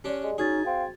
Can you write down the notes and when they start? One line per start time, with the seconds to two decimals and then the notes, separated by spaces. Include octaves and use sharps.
0.04 C#4 D4 G4 D5
0.23 G#3
0.38 C#4 D#4 F#4 G#4 G#6 A6
0.66 C4 F5